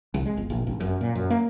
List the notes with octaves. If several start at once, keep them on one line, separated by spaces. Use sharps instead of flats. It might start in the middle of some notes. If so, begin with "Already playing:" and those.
C2
G#3
G1
A#1
G#1
F#2
A#2
F#2
A#3